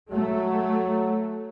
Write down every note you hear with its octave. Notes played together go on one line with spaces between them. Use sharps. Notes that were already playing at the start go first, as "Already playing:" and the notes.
F#3 A3